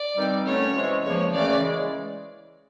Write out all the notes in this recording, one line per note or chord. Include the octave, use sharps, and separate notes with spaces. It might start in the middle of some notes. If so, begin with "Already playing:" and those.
Already playing: D5
G2 D#3 G3 C4 D#4
D3 F#3 A3 C#4 C#5
C3 E3 G#3
E2 C#3 F3 A#3 C#5
F#2 C#3 E3 A3 C#4 D5
C#3 E3 G#3